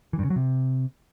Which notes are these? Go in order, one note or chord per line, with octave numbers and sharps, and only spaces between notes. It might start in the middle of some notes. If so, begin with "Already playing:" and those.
E3
G2
C#3
F#3
C3